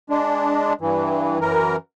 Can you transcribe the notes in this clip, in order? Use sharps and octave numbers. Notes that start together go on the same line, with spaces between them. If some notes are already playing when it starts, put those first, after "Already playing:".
G#3 D4
G2 E3
F#2 E3 A#4